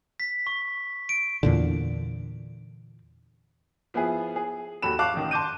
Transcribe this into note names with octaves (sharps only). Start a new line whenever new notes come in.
B6
C#6
D7
E2 A#2 D3
F3 B3 E4 G#4
G#4
D#2 F#4 A4 B5 E7
F5 A5 C#6 D6 F#6
A1 D#3
A5 C6 D6 G6 D#7